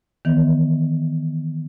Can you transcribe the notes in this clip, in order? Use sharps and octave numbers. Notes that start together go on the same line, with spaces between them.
D#3 E3 B3